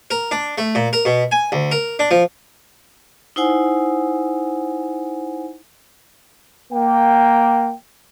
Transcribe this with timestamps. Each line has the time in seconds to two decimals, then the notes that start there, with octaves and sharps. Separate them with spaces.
0.11 A#4
0.31 D4
0.58 A3
0.75 A#2
0.93 A#4
1.05 B2
1.32 G#5
1.52 D2
1.71 A#4
1.99 D4
2.11 F3
3.36 D#4 E4 C5 F#5 G#5
6.73 A#3 G5